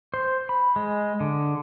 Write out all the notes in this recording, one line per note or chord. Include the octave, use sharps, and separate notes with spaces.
C5
B5
G#3
D3